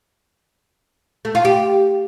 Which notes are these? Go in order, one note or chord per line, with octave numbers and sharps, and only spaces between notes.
A3
F4
G4